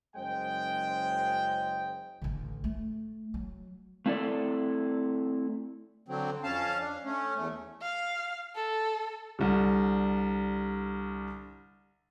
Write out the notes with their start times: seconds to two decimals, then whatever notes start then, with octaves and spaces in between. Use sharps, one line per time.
0.16 F#1 F#2 G#3 C5 G5
2.22 A1 D3
2.64 A3
3.34 F#3
4.06 A3 C4 E4 A4 D5
6.08 D3 F#3 C4
6.44 F2 C#4 F5 A5
6.79 D4
7.04 A3 C#4
7.36 E2 A3
7.82 F5
8.56 A4
9.39 C2 D3 G3